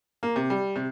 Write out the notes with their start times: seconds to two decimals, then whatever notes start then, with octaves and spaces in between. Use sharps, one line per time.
0.23 A#3
0.36 C3
0.50 G3
0.76 C3